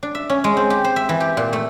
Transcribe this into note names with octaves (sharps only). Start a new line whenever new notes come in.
D4
E5
C#4
G#3
C4
G4
C5
E5
E3
G4
A#2
A3